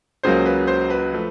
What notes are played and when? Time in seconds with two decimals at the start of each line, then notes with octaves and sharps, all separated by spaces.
0.23 C#2 C#3 F#3 A#3 C5
0.45 B4
0.67 C5
0.90 B4
1.13 F3 A3